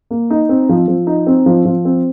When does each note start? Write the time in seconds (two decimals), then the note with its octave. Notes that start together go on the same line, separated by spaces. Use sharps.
0.11 A#3
0.30 D#4
0.49 C4
0.69 F3
0.88 F3
1.07 D#4
1.27 C4
1.46 F3
1.65 F3
1.85 C4